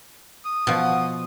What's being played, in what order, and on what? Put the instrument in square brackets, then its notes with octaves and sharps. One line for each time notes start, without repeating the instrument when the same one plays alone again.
[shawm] D#6
[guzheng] B2 F3